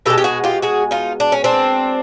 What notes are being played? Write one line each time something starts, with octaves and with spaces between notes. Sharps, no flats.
B2 G#3 G4 A4
G4
F#4 G#4
F4 G4
F#4 G#4
D#4 F4
D4
C#4
C4 D4